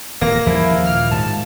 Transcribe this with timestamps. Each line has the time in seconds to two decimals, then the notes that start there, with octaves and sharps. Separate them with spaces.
0.21 D#1 E3 A#3 A#6
0.46 D#2 C#3 F3 G3 E4
0.86 A#2 F6
1.11 G#2 D#3 A5